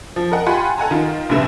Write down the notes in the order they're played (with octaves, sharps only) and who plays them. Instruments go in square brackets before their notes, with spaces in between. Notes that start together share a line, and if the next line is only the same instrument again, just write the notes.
[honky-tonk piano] F3
A#4 D#5 F#5
F4 G4 F#5 G#5 B5 C6
A4 F#5 G#5 A#5
D#3 F4
A#1 G2 C3 A3 B4 E7